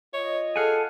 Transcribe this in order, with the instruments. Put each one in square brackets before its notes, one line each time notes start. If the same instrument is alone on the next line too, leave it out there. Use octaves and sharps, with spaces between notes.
[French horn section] F4 D#5 [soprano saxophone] C#5
[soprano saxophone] G#4 [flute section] A4 A5 [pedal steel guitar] F5 F#5 G#5